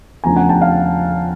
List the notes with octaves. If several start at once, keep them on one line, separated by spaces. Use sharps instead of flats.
E2 C#3 F3 A3 D4 G#5 A#5
F#5 G#5
G5 A5
F5 G5